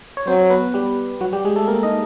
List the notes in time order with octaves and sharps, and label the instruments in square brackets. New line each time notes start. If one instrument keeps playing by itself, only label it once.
[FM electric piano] C#5
[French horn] F#3 [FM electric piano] C4 C5
[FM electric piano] B3 B4
G3 G4
F#3 F#4
G3 G4
G#3 G#4
A3 A4
A#3 A#4
D#4 D#5